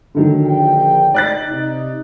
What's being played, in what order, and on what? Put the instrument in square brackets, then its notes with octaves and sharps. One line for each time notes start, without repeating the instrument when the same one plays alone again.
[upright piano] D3 D#3 F#3
[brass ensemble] A#1 G5
[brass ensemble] D#4 [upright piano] D5 F#6 A6
[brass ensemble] C3 D#4